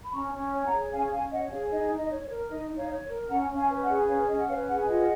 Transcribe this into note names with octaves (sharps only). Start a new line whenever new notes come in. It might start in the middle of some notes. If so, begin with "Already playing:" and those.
B5
C#4 A#5 C#6
C#4
C#5
F#5 A#5
G#4
C#4 F5 G#5
C#4 F5 G#5
C#5 D#5 F#5
G#4 C#5 F5
D#4 D#5
D#4
D#5
C#5
C#5
A#4
D#4 D#5
D#4
C#5 F5
C#5
A#4
C#4 F#5 A#5
C#4
F5 G#5
B4
D#5 F#5
G#4
C#4 C#5 F5
C#4 D#5
F#5
B4 C#5 F5
G#4 F#5
G#5
F4 D#5 F#5